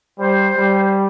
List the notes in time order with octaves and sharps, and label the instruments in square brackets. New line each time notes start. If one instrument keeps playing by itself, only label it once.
[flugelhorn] G3 [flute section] C5
[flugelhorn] G3